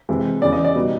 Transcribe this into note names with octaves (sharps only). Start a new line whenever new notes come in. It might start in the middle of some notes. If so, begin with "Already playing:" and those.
C3 E3 G#3
E2 C#3 E3 D5
D#5
D5
B2 G3 B3 D#4